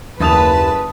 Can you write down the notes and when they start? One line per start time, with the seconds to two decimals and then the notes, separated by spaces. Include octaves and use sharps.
0.20 F#1 D#2 B4 A5 D#6 F7